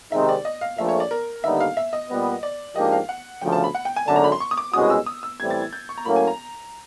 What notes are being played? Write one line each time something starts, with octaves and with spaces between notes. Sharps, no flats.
C3 D#3 G#3 C4 D#4 E5
D5
D#5
F5
A#1 A#2 F3 A3 E5
C#5
D5
A#4
D#2 D3 G3 B3 D#4 E5
F5
E5
D#5
A#2 G3 B3
D5
G#2 F3 A#3 D4 G4 D#5
F5
F#5
D2 C#3 F3 G5
A5
B5
F#5
G5
G#5
G#1 F#2 D3 A5
A#5
B5
C6
C#6
D#6
D6
C2 B2 G#3 C#4 F#4 D#6
E6
D#6
E6
A2 E3 G3 C4 G#6
A6
G#6
G6
C#6
A#5
A2 F#3 A#3 C#4 B5
G#5
A#5